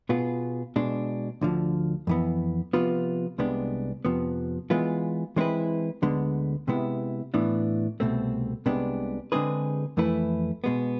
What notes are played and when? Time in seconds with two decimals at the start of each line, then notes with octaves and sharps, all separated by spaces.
0.09 B2 B3 F4 G#4
0.76 B2 G#3 D4
1.41 D2 D3 F3
2.07 F2 E3 B3
2.73 C3 F3 B3 F4 B4
3.38 C2 C3 G#3 B3 D4
4.05 F2 C3 F3 B3
4.70 E3 G#3 B3 F4
5.36 E3 G#3 C4 E4 B4
6.02 D2 D3 G#3 B3
6.68 C3 G#3 B3 E4
7.34 A2 E3 B3 D4
8.00 C2 B2 A3 C4
8.66 C2 C3 G#3 B3 D4
9.32 D3 G#3 C4 G#4 B4
9.97 F2 E3 A3 E4 B4
10.64 B2 G#3 B3